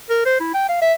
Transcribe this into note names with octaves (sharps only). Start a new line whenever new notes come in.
A#4
C5
E4
G5
F5
E5